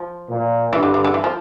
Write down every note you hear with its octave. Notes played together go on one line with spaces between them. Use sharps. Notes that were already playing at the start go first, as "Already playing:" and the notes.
Already playing: F3
A#2
G2 E3
D3
D3
D3
E3
F3